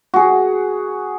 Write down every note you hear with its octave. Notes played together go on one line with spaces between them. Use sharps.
F#4 G#4